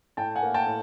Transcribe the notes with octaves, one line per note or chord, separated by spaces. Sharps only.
A2 G5 A5
F#5 G#5
A#3
G5 A5
A2